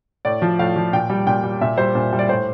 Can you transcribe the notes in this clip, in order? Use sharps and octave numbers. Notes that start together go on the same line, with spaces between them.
A2 D5
F3
A2 F5
F3
A#2 G5
G3
A#2 G5
G3
A#2 E5
G3 C5
A#2
G3
D5
A2 C5